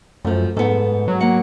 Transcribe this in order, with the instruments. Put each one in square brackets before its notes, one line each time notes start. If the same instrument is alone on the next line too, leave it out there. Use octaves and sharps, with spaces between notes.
[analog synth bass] F#2 [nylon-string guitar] F3 A3
[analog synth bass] G#2 [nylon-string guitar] B3 A4
[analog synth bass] F#3
[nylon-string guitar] A#3 F#5